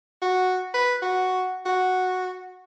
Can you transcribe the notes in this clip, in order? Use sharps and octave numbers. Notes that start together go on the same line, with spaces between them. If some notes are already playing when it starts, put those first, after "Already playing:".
F#4
B4
F#4
F#4